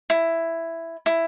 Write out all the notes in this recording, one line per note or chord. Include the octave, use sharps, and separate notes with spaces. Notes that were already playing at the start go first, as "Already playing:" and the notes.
E4
E4